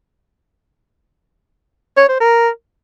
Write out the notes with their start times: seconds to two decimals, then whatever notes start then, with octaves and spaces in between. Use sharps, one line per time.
1.97 C#5
2.09 C5
2.20 A#4